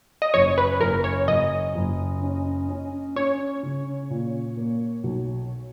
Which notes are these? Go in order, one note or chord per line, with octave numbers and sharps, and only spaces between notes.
D#5
F#1 C#5
B4
F#1 A#4
C#5
F#1 D#5
F#1
C#4
C#4
C#4 C#5
C#3
A#2
A#3
B1